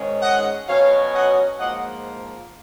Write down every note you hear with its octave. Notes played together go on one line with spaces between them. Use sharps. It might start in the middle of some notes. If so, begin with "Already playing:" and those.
Already playing: G#2 D#3 G#3 C#4
D#5 F#5
B2 F#3 C#4 C#5 F5
D#5 F#5
G#2 F3 A#3 D#5 F#5